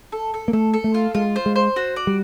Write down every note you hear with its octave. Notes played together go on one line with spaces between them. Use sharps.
A4
A4
A#3
A3 A4
A4
A3
F4
G#3 F4
C5
G#3
C5
F#4
D5
G3